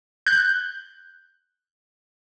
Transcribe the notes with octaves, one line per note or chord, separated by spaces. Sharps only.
F#6 G6